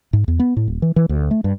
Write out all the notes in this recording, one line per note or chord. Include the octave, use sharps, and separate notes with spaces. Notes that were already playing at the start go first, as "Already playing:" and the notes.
G#2
E2
B3
A2
D#1
E3
E3
D2
A3
G2